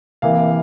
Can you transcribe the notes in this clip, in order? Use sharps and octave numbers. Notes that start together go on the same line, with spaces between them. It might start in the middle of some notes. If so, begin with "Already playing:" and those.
C3 E3 A#3 F5